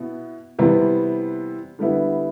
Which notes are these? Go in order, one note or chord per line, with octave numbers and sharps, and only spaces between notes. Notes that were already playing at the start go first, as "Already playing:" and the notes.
Already playing: B2 B3 E4
C3 E3 G3 B3
D3 G3 B3 E4